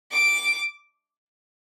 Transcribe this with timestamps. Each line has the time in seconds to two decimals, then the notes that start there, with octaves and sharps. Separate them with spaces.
0.12 D6